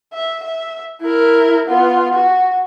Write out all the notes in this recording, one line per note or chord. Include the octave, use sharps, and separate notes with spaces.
E5
E5
E4 A#4
B3 F4
F#4